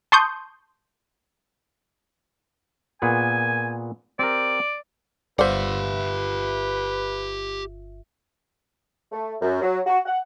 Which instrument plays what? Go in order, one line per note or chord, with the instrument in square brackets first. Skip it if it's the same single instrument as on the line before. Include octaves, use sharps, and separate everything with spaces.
[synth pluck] A5 C6 C#6 D#6 G6
[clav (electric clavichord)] A#2 B3 G#4 [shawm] G#5
[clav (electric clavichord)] C4 G4 A#4 [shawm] D5
[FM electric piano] G1 F4 E5 [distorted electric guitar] G4 F#5 [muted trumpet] B4 [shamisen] C5 D5
[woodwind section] A3
F#2
F#3
F#4
F#5